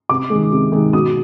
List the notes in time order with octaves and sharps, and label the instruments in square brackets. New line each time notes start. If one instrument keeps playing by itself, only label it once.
[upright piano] C3 D6
D#3 G#3
C3
D#3 G#3
B2 D#6